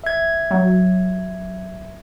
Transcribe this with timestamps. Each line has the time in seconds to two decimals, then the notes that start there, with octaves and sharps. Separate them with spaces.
0.04 E5 G#6
0.51 F#3